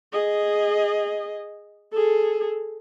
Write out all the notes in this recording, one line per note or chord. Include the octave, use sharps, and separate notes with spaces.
G#4 D#5
G#4 A4